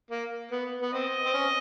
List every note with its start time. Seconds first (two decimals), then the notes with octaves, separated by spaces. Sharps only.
0.11 A#3
0.51 B3
0.82 B3
0.93 C4 D#5
1.26 C4
1.34 C#4